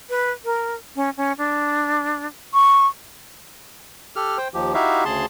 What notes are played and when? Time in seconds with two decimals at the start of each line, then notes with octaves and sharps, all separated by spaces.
0.10 B4
0.45 A#4
0.96 C#4
1.17 C#4
1.38 D4
2.54 C#6
4.16 G4 A4 F6
4.38 C5 G5
4.54 D#2 F3 G4
4.74 D#4 E4 F#4 G4 E5 F5
5.05 D2 C#3 G#4 A5 C6